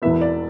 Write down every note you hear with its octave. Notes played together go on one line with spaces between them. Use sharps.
E1 E2 E3 B3 E5
D5